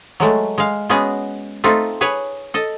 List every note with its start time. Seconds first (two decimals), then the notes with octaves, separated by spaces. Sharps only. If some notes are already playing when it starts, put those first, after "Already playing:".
0.20 F#3 G#3 A3
0.58 G#3 F5
0.89 G#3 B3 C#4 F#4 G#4
1.64 A3 C4 D#4 F4
2.01 G#4 B4 C#5
2.54 A4 D#5